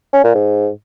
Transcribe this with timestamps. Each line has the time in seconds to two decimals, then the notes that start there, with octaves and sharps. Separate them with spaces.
0.13 C#4
0.24 A#2
0.35 G#2